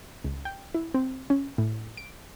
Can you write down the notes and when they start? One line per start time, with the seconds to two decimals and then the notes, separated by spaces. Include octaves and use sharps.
0.24 C#2
0.45 G5
0.75 E4
0.94 C4
1.30 C#4
1.58 A2
1.97 D7